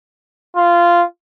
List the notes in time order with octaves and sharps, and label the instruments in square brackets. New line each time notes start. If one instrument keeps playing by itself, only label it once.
[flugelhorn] F4